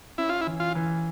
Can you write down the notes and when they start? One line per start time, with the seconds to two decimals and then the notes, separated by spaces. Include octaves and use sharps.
0.18 C#4 E4
0.29 F4
0.41 E4
0.47 E3
0.60 F4
0.75 E3